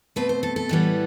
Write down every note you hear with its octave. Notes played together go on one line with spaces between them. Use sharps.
B2 A3 C4 B4
C5
A4
A4
A2 E3 G3 B3